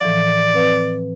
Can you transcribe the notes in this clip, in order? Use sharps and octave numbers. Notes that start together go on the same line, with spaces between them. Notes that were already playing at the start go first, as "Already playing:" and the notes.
A2 E3 F3 D5
C4 B4 F5